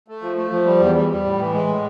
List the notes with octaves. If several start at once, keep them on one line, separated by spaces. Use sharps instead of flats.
A3
F3
A3
F3
G3
E2
G3
G3
A2
E3
G#3
A2